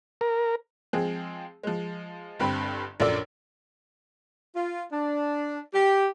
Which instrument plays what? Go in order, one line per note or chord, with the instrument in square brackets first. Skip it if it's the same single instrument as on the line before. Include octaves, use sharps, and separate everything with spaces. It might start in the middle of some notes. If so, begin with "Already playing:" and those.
[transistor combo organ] A#4
[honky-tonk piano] F3 G#3 C4 G#4
F3 G#3
G1 G2 C4 B5
A#1 F#2 D4 A4 D5 E6
[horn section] F4
D4
G4